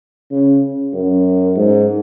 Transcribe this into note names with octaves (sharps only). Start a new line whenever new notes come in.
C#3
F#2
G#2